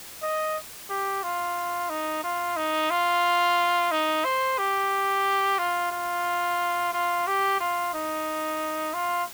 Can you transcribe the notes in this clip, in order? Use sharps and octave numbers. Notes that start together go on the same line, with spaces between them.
D#5
G4
F4
D#4
F4
D#4
F4
D#4
C5
G4
F4
F4
F4
G4
F4
D#4
F4